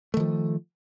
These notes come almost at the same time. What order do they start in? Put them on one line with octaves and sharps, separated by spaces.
A3 D#3 F3